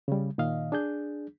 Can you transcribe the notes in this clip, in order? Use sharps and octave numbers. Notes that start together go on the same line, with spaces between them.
C#3 G3
A#2 D#3 D#5 F5
D4 G#4 G6